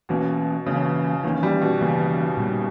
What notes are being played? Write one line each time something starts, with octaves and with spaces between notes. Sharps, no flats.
B2 E3 A#3 C#4
C#3 E3 A#3 C#4
D#3 E3 A#3 C#4
G3
B2
C#3 E3 A#3 C#4
A#2 G3 B3